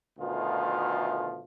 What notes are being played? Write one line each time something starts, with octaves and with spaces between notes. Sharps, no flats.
D2 B2 D#3 F3 A3 F4